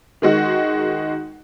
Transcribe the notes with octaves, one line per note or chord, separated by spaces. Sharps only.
D#3 G#3 F#4